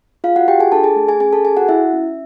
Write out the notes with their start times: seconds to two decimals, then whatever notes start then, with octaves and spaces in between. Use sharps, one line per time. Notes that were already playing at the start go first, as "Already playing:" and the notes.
0.24 F4 G#4 F5
0.36 F#4 F#5
0.48 F4 G4 G5
0.60 G#4 G#5
0.72 D4 A4 A5
0.84 G#4 G#5
0.96 A3
1.08 G#4 G#5
1.20 C#4 G#4 G#5
1.33 A4 A5
1.45 G4 G#4 G#5
1.57 F#4 F#5
1.69 E4 E5
1.93 C#4